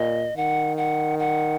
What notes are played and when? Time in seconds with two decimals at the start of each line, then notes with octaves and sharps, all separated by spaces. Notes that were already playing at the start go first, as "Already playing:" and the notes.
Already playing: A#2 D#5
0.37 D#3 F#5
0.77 F#5
1.19 F#5